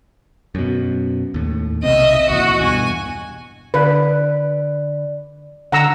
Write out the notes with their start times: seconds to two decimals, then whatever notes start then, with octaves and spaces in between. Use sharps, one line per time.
0.55 F#2 B2
1.34 D#2 A2
1.83 B1 C3 C4 D#5 E5
2.30 C#2 A#2 E3 F#4
2.61 E2 G2 B2 G#5
3.74 D3 B4 D5
5.72 D3 F#5 A#5 E6